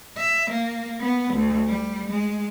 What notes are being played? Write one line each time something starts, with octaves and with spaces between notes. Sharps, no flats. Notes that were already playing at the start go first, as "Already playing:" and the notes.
E5
A#3
B3
D2
G3
G#3